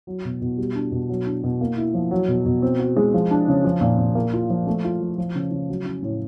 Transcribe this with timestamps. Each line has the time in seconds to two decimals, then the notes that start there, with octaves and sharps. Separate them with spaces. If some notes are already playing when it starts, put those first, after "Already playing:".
0.07 F#3
0.25 B2
0.41 B2
0.58 G3
0.75 D4
0.92 B2
1.09 F#3
1.26 D4
1.44 B2
1.61 A#3
1.77 E4
1.94 F3
2.11 F#3
2.28 B2
2.46 B2
2.62 C4
2.79 F#4
2.97 G#3
3.14 F3
3.31 D4
3.48 C#3
3.64 F3
3.81 A#2
3.99 A#2
4.15 A#3
4.33 F4
4.50 F3
4.67 A3
4.84 F4
5.00 F3
5.18 F3
5.35 C#3
5.51 C#3
5.69 F#3
5.85 C#4
6.03 A2